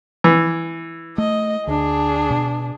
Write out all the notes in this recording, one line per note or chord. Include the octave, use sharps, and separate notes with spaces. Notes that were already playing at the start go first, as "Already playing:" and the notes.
E3
A3 D#5
D2 D4 G#4
B2